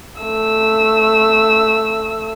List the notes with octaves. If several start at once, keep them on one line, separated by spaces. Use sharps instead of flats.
A3 E6